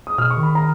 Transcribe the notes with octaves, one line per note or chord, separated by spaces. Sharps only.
D#6
B2 F6
C#6
D#3
B5
A#5